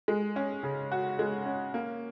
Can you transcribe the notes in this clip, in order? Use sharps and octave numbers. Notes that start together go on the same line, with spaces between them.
G#3
C#4
C#3
F#4
G#3
C#4
A#3